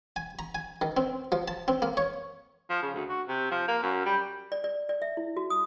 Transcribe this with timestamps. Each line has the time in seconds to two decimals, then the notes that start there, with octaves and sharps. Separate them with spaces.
0.16 G#5
0.39 A#5
0.55 G#5
0.81 D#3
0.97 C4
1.32 F3
1.48 A5
1.68 C4
1.82 A#3
1.97 C#5
2.70 F3
2.83 C#3
2.95 D2
3.09 F#4
3.28 C3
3.51 F3
3.68 A#3
3.82 F#2
4.06 G3
4.52 D5
4.64 D5
4.89 D5
5.02 E5
5.17 E4
5.37 F#4
5.50 D#6